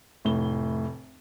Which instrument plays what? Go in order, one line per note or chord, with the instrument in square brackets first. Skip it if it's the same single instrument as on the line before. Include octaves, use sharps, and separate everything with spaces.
[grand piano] F1 A2 G7